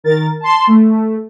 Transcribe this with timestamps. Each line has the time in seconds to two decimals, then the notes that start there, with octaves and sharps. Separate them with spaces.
0.04 D#3 A#4 A6
0.40 A5 C6
0.67 A3